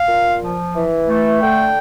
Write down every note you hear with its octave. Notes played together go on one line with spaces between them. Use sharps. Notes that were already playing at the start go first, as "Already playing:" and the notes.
Already playing: F5
A#2
F3
E3
A3
D3 G5